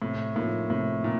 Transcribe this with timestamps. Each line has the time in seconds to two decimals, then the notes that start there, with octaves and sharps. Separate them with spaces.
0.02 A2 C3
0.35 A2 F3 A#3 D#4
0.70 A2 C3
1.04 A#2 D#4